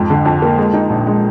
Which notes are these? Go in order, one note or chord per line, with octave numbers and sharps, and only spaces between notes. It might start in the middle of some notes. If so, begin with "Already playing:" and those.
Already playing: F2 G#2
D3
F2
A#3
G#3
D#4
A#1
G#3